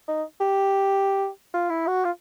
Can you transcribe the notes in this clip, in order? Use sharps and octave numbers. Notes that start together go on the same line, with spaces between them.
D#4
G4
F4
E4
F#4
F4